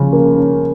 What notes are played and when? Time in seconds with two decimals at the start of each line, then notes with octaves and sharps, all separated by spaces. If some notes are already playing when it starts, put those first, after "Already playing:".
Already playing: C#3 F3 C#4
0.13 A#3
0.36 C#4